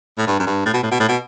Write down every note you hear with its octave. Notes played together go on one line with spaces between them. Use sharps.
A2
G2
F#2
G2
A2
B2
A2
B2
A2
B2